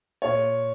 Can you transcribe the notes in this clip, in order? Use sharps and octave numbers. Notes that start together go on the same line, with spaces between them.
A#2 C#5